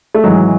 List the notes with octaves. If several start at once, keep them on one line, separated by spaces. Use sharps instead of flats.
A3
G#1 G#2 E3 F#3 G#3